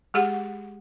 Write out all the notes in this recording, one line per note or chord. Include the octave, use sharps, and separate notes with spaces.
G#3 G4 G#4 F#5